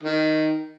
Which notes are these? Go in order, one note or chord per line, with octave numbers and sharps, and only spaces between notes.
D#3